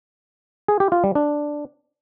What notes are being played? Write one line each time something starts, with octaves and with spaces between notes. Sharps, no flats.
G#4
G4
F4
G3
D4